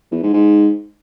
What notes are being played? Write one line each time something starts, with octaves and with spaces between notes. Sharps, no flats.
E2
G#2
G#2